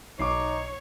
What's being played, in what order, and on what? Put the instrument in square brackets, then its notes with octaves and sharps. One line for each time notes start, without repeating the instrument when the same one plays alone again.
[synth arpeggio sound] B1 [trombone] D#4 [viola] C#5 [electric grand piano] C#6 D6 C7